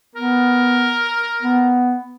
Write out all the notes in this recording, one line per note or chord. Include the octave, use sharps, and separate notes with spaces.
B3 A#4
B3